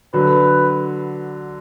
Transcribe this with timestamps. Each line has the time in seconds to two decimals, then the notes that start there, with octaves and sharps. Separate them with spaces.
0.14 D3 F#3 B4